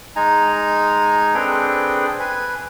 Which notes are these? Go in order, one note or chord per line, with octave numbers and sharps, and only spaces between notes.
G#3 D#4 G#5 A#5
C4 D4 G#4 A4 B4 G5
B4 G#5